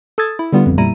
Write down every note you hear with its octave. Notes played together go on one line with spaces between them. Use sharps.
A4 D#6 E6 G#6 A6
E4
D3 G3 B3 F4
G#1 F2
A#2 G3 E4 A#5 D#7